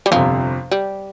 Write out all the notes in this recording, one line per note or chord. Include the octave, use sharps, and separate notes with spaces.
G3
G1 F2 C3 F3
G3